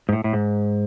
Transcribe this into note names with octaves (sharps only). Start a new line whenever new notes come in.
G#2
A2
A2
G#2